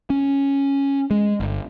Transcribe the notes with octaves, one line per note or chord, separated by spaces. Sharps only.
C#4
G#3
G1